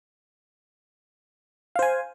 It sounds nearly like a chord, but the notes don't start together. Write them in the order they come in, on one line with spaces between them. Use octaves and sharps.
F5 C5 G#5